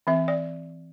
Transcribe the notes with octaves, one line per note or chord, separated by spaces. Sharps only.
E3 C4 E5
D5